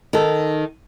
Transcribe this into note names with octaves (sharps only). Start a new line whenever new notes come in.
D#3 A4